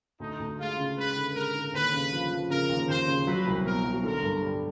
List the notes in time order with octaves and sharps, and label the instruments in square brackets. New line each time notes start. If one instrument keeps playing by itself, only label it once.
[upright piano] D2 [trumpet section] D#4
[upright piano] D2
[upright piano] G#3 [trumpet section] F4
[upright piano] C#3
[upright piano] G#3 [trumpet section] B4
[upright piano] D3
[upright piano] G#3 [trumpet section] A#4
[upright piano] D3
[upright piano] D#2 [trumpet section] B4
[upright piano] C#3
F3
F3
[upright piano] C#3 [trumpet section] A#4
[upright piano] D#2
[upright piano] D#2 [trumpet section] C5
[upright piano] C#3
[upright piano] F#3 [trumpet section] B4
[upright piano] C2
[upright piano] B2 [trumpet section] A#4
[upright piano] F#3
[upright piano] D3 [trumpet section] A#4
[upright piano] G2
G3